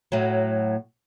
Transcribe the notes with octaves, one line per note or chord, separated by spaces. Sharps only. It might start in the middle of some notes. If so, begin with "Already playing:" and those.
A2 F#3